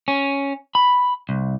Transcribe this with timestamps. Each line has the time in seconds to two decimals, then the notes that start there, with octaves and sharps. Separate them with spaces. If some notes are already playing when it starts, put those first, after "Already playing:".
0.08 C#4
0.75 B5
1.29 C2